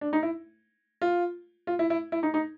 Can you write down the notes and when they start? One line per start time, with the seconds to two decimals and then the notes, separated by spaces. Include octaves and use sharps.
0.01 D4
0.13 D#4
0.23 E4
1.02 F4
1.67 F4
1.79 E4
1.90 E4
2.12 E4
2.23 D#4
2.34 D#4